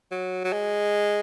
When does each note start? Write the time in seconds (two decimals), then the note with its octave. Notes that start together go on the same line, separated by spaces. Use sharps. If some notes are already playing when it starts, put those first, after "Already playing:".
0.11 F#3
0.44 F#3
0.53 G#3